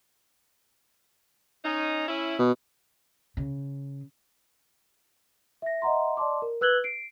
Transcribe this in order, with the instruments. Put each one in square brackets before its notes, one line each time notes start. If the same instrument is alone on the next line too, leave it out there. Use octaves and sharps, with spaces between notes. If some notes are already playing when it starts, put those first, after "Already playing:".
[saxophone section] C#4 D#4
C#4 E4
[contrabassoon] B2
[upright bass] C#3
[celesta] E5 A#6
D#5 E5 F#5 A#5 C6
D5 D#5 A5 C6 D6
A#4
B4 E6 F#6 G#6 F#7 G7
C7 D7